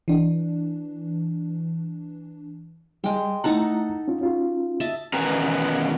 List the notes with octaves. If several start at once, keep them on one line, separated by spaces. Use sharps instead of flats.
E3 D4
G3 G#3 G5
A3 D#4 E4 A4 F#5 A#5
C#4 F4
C#4 F4 F#4
D#5 E5 A5
E2 B2 D#3 C#4 B4 A#5